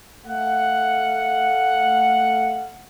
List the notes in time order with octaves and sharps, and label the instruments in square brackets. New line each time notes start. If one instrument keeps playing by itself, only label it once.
[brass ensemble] A3 F5 F#5